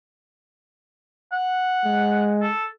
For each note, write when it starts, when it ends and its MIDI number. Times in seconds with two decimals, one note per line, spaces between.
1.32 2.32 78
1.85 2.50 56
2.42 2.64 69